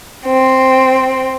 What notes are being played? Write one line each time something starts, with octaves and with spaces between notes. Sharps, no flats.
C4